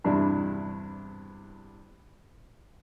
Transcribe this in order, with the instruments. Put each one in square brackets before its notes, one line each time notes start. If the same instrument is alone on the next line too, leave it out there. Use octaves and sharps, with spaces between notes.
[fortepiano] E2 G2 C3 D4 E4